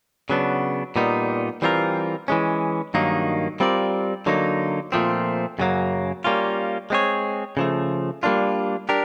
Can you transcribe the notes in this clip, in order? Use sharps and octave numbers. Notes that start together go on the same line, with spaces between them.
C#3 F#3 B3 D4
A#2 G3 B3 D#4
E3 G3 C4 F4 A#4
E3 G#3 C#4
G2 D#3 F#3 A#3 D#4
G3 C4 F4 A#4 D5
D3 F#3 A#3 D#4
A#2 F3 A3 C4
F#2 C#3 F#3 A#3
G3 A#3 C#4 F4
G#3 C4 E4 G#4 C#5
C#3 F3 A3
G3 A#3 D4 F4
D4 G4 A#4